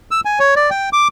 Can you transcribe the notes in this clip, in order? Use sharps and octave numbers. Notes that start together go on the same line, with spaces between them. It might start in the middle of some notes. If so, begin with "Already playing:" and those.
E6
G#5
C#5
D5
G5
D6